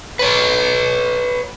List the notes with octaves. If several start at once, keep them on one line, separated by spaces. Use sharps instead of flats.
B4 C#5